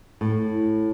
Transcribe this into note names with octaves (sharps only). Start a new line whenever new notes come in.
A2